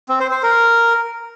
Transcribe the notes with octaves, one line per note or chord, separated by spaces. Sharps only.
C4
C5
C5
A#4